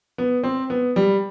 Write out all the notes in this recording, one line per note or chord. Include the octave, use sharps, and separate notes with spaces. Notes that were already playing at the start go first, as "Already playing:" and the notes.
B3
C4
B3
G3